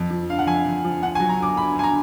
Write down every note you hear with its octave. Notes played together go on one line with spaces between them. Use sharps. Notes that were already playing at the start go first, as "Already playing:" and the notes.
Already playing: F2
F3
D3 F5
F#5
F2 G#5
F2
F3
D2 F#5
G#5
F#3
A#5
D3 D6
D2 B5
D2 G#5
A#5